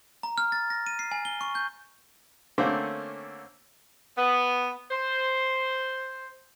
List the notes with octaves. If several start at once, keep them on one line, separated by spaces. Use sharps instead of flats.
A#5
F6
A6
A#6
D#7
C7
G#5
G7
C#6
G6
D3 A3 A#3 C4 C#4
B3
C5